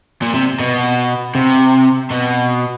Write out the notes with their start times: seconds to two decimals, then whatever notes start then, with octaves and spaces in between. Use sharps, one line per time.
0.22 A#2
0.34 C3
0.60 B2
1.35 C3
2.11 B2